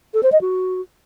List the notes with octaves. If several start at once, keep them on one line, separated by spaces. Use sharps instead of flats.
A4
C5
D#5
F#4